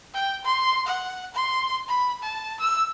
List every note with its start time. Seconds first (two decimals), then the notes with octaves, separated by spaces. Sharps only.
0.14 G5
0.44 C6
0.87 F#5
1.34 C6
1.88 B5
2.22 A5
2.60 E6